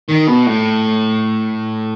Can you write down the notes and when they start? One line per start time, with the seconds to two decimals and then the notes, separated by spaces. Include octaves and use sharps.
0.09 D#3
0.27 B2
0.46 A2